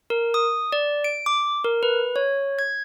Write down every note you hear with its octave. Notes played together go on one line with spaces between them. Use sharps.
A#4
D#6
D5
D7
D6
A#4
B4
C#5
G#6